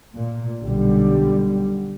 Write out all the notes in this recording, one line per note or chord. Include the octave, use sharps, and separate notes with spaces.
A#2
B1 D3 G3